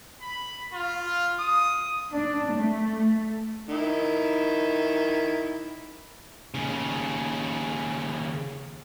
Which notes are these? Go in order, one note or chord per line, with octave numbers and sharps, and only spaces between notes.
B5
F4
D#6
D4
A3
D#3 E4
D#2 C#3